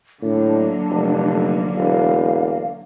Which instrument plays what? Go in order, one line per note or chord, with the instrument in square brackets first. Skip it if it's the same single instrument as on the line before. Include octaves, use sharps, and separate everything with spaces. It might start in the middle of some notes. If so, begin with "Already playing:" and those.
[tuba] A2 [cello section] D3 F#3 A#3 [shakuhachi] D4
[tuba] F1
[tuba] E1 [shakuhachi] F5